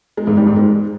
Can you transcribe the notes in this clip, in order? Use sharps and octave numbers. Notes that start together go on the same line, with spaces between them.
G#3
G#2
G3
G#2
G#3